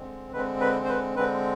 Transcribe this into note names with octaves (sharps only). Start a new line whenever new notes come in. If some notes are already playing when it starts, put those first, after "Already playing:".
Already playing: D3 G#3 C4
D3 G#3 C4 B4
B4
C5
B4
D3 G#3 C4 B4